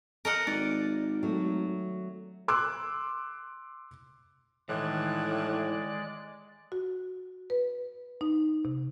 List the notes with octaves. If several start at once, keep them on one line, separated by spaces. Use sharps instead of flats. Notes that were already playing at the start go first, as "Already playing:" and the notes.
A#4 D#5 F#5
G#1 D5
F#3 A3
C6 D6 E6 F#6
A2 D#3 E3 G#3 D5 F#6
F#4
B4
D#4
C3